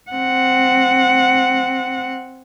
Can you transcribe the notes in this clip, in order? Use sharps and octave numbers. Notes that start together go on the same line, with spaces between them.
C4 F#5